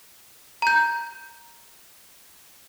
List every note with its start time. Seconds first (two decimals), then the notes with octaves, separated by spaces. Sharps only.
0.62 A#5 G6